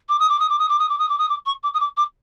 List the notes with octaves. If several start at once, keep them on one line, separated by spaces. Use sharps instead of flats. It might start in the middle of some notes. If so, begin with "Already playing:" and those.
D6
D#6
D6
D#6
D6
D#6
D6
D#6
D6
D#6
D6
D#6
D6
C#6
D6
D#6
D6
D6